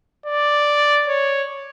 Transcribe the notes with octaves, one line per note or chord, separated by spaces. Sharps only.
D5
C#5